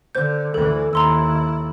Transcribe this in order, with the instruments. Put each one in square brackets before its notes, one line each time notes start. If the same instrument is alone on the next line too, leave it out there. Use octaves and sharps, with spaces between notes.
[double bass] D3 [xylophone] C5 G6
[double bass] D2 E3 [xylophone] A4
[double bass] D#2 E4 [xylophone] A#5 C6 E6